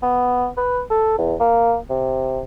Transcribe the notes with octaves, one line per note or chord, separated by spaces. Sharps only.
B3
B4
A4
E2
A#3
C3